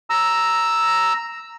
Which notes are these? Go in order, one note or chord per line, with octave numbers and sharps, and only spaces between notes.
A#5 E6